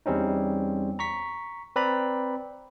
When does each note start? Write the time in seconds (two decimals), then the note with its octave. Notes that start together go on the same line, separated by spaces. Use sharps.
0.06 E2 G3 C4 C#4 D#4
0.99 A#5 C#6 B6
1.76 C4 B4 D5 A#5 B5